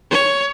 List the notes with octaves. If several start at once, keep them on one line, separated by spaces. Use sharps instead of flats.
C#5